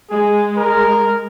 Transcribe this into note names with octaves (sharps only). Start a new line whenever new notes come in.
G#3 G#4
A#4